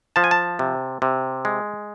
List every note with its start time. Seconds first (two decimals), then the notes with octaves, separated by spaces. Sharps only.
0.16 F3 A5
0.24 G#5
0.31 A5
0.59 C3
1.02 C3
1.45 G#3